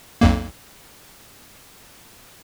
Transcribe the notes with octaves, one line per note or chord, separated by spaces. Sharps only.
B1 F2 A#3